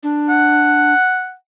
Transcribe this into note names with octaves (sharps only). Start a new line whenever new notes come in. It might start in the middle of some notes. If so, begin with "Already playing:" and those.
D4
F#5